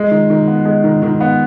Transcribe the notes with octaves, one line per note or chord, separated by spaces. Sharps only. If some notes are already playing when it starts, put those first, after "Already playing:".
Already playing: G#3
D#3
D#3
B3
G#3
D#3
D#3
B3